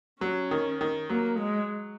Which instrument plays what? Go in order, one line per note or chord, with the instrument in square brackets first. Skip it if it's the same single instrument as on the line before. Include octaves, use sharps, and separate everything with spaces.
[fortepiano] F#3 [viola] C#4
[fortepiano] D#3
D#3
[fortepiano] F#3 [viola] A#3
[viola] G#3